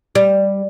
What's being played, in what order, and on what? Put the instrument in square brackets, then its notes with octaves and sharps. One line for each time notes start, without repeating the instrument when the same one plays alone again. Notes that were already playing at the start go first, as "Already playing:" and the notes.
[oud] G3